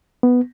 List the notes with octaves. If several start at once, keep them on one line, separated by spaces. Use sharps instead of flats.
B3